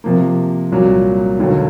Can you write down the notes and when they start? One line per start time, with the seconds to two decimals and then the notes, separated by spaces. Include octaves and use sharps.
0.04 C3 F3 A#3
0.72 C2 A#2 F#3
1.39 E1 D#2 D3 F#3